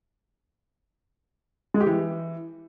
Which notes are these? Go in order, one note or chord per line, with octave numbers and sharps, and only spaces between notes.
G#3
G4
E3